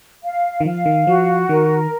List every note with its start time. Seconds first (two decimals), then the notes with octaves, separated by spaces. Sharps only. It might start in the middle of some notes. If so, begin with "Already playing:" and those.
0.24 F5
0.60 D#3
0.65 F3 F5
0.86 D#3
1.07 F3 F#4
1.48 D#3 A#4